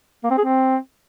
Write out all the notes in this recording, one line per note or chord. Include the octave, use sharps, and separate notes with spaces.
A#3
C4
G#4
C4